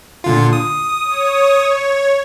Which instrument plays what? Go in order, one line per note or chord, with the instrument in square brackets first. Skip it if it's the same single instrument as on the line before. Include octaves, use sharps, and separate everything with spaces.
[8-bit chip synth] A#2 D3 F4
D#6
[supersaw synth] C#5